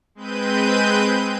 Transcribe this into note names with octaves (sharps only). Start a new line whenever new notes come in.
G#3 C4 B4 G6 D#7